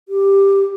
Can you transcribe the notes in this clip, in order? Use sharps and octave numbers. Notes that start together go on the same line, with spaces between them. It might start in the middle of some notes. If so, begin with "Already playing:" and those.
G4